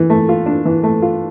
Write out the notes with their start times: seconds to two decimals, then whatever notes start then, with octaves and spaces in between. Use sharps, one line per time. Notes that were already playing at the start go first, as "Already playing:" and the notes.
Already playing: E3
0.10 A3
0.29 F4
0.46 D4
0.65 E3
0.83 A3
1.02 F4